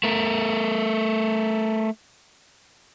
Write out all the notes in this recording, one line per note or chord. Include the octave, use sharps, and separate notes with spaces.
A3 A#4